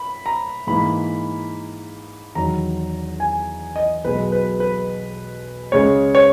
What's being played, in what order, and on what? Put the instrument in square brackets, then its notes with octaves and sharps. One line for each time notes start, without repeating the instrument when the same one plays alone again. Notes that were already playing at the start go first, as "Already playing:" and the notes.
Already playing: [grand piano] B5
A#5
G#2 E3 A#3 B5
E2 D#3 F#3 A#5
G#5
D#5
B1 B2 G#3 B4
B4
B4
C#2 C#3 G#3 C#5
C#5